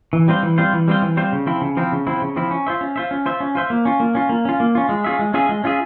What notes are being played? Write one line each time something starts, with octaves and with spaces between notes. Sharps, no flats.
E3
G3 C4 F4 C5
E3
G3 C4 F4 C5
E3
G3 C4 F4 C5
E3
G3 C4 F4 C5
C#3
F3 C4 E4
C#3
F3 C4 E4
C#3
F3 C4 E4
C#3
F3 C4 E4
C#4
F4 C5 E5
C#4
F4 C5 E5
C#4
F4 C5 E5
C#4
F4 C5 E5
A#3
C#4 F4
A#3
C#4 F4
A#3
C#4 F4
A#3
C#4 F4
G#3
C#4 F4 G#4 E5
G#3
C#4 F4 G#4 E5
G#3
C#4 F4 G#4 E5